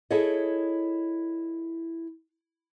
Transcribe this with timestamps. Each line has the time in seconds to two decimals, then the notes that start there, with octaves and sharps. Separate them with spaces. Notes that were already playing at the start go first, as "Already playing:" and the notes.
0.11 E4 G#4 A4 C#5 D#5